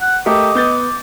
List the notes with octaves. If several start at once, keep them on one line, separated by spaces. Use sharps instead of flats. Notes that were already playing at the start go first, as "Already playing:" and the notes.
F#5
A3 G4 A#4 D#5 D6
B3 G6 A6